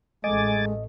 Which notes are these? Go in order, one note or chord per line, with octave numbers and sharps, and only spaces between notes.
A1 G#3 A3 D#5 G#5 D6 A6